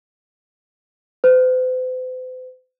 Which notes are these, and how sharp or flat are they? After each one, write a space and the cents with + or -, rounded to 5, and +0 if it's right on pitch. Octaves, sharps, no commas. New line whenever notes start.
C5 -45